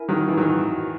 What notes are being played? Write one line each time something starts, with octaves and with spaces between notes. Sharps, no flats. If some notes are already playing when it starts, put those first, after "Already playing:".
Already playing: E4 A#4 E5 G#5
D#3 F#3
E3
D#3 F#3